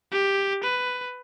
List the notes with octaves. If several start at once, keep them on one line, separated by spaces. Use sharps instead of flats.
G4
B4